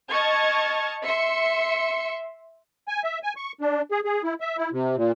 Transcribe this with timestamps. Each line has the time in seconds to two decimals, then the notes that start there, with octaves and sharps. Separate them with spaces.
0.11 D#5 A5 C#6 F6 G#6
1.04 E5 C6 C#7
2.88 G#5
3.04 E5
3.23 G#5
3.37 C#6
3.61 D4
3.91 G#4
4.05 G#4
4.24 E4
4.41 E5
4.58 E4
4.73 C3
4.97 A#2